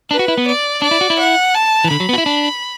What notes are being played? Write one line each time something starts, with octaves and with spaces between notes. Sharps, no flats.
D4 B4
F#4
E4
B3
D5
D4 D5
E4
F#4
E4
F#5
A5
E3
D3 B5
F#3
B3
F#4
E4
D4